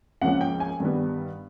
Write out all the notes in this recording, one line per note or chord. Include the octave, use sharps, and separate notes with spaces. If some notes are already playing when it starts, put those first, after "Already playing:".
C#2 C#3 F3 A#3 C#4 F#5
G5
G#5
G2 D#3 G3 B3